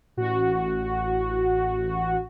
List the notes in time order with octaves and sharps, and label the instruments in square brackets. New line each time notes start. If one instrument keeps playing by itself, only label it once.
[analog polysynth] A1 F#4